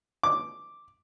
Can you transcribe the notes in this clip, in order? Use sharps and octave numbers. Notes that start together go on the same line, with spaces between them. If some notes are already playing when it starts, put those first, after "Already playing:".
D6